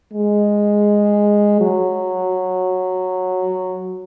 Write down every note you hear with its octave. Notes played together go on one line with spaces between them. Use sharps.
G#3
F#3